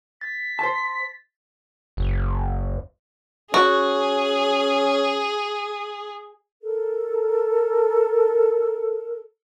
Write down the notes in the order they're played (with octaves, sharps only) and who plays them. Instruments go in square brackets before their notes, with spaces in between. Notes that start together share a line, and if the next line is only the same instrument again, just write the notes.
[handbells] A6 [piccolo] B6
[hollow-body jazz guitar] C5 A5
[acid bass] F#1
[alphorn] C#4 [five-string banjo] F#4 [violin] G#4
[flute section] A4 A#4